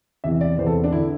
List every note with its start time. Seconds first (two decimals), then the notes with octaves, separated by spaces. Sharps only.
0.24 E2 C3 E3 E5
0.41 D5
0.58 E2 C3 E3 C5
0.67 A4
0.84 D4
0.92 D3 E4